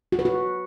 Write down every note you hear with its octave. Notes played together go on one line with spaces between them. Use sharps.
F#4
B4
F#4